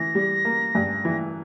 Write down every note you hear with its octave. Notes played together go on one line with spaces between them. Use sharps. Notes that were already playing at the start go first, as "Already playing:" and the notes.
Already playing: E3 A#6
G3
A#3
G2
E3